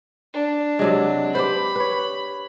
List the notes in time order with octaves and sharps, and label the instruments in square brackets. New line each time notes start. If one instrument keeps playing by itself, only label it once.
[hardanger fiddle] D4
[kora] C3 F#3 G#3
[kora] G4 B4 C5 [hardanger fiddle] B5
[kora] B4 C#5